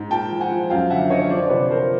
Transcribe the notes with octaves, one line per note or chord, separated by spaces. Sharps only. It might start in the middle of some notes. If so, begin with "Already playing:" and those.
Already playing: G#2
A#2 G5 A5
F3
F#5 G#5
F3
F#2 F5 G5
D3 E5 F#5
D3 C#5 D#5
F3 C5 D5
D5
C3 B4 C#5
F3 A#4 C5